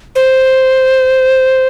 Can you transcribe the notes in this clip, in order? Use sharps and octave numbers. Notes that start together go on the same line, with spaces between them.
C5